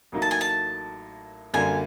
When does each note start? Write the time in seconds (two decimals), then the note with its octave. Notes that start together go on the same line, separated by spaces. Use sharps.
0.12 A1 A2 F#3 A#3 D#4
0.22 A5
0.31 G#5
0.41 A5
1.54 F#2 D3 G3 A#3 G#5